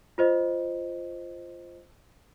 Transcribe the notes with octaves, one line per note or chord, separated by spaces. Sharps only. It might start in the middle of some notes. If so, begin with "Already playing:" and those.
F4 C5 D#5